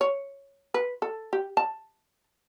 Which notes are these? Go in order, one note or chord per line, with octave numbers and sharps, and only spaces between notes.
C#5
B4
A4
G4
A5